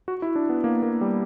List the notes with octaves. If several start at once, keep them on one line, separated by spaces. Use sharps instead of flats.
F#4
E4
D4
B3
A#3
A#3
G3